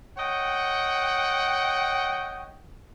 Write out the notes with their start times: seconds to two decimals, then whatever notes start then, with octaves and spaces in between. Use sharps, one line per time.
0.17 C#5 D#5 F#5 G5